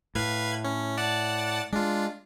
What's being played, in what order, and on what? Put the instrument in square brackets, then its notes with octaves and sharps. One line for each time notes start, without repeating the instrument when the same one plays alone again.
[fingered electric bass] A2 [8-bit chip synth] B4 F5 G#6
[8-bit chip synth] C#4
D5 F#5 A5
[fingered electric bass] G#3 [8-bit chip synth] D4 F4